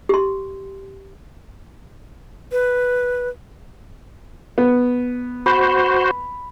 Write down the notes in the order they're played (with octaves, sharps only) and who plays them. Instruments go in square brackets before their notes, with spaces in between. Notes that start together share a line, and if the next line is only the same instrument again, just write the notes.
[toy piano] G4 C6
[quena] B4
[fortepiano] B3
[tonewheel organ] F#4 C5 [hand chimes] B5